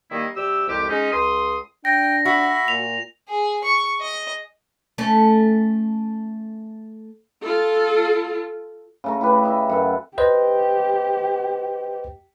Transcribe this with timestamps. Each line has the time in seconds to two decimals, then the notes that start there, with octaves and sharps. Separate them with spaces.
0.11 D#3 G3 A#3 E4 D#5
0.36 C3 G3 G4 E6
0.68 C2 F2 G#3 G4
0.89 G#3 C#4 D#4
1.12 C#2 C6 D#6
1.85 D4 G5 A#6
2.25 F#4 E5 B5
2.68 A#2 F7
3.29 G#4
3.64 C#6
4.01 D#5
4.98 A3 C#4
7.42 F4 A4
9.04 C#3 A3 A#5
9.21 E4 G4 B4
9.44 D#5 E5
9.69 F#2 A4 B4
10.18 G4 B4 C5 D#5